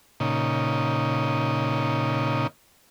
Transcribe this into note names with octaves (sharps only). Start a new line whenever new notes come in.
A#2 C#3 D#4